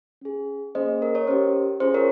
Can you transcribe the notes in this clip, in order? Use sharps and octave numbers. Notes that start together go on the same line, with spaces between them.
C#4 G#4
A#3 C#4 G#4 C5 D#5
A#4
A#4 C#5
C#4 G4 C5
C#4 F4 G#4 C5
A#4 C#5